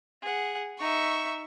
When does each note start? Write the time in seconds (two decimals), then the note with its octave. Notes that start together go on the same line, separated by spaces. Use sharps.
0.22 G#4 F#5
0.80 D#4 E5 C#6